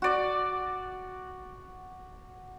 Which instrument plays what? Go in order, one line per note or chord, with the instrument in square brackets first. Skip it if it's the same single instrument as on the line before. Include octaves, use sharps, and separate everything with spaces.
[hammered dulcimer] F#4 D5